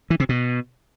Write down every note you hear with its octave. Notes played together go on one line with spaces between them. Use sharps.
E3
C3
B2